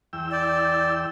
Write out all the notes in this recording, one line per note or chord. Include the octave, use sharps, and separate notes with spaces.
E2 G5 E6
D5